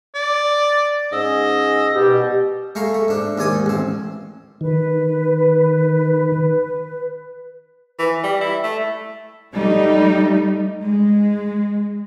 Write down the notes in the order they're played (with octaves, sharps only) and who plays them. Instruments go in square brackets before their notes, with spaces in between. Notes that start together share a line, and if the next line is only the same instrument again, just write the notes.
[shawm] D5
[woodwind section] G#2 C#4 E6 [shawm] D#5
[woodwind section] B2 G3 [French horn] G4
[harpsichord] G#3 A3 F5 A#5
A3
G#2 D4
D#2 G#2 D5 G#5 D#6
A1 C4
[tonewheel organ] D#3 [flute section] B4
[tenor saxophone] E3
G3
E4
A3
[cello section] G3 A3 D#4
G#3